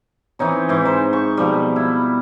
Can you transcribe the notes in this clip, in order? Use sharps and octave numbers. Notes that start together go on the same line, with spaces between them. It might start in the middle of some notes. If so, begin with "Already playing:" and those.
E3 C4 D#4 C#5
G#2 E3
D#4 C5
C#6
B2 F3 G3
E4